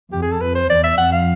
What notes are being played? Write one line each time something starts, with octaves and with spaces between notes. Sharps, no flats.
F2 G4
G#4
A4
F2 B4
C5
E2 D5
E5
F2 F#5
F5